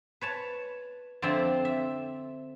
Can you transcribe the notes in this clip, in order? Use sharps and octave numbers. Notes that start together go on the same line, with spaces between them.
B4 C#5 A5
F2 D3 C4 D4 F4 E5
E5